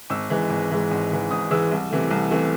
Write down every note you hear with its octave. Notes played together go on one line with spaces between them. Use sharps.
G#1 E6
G#2 E3 G#3
G#1
G#2 E3 G#3
G#1
G#2 E3 G#3
G#1 D#6
G#2 E3 G#3 E6
C2
C3 E3 A3
C2
C3 E3 A3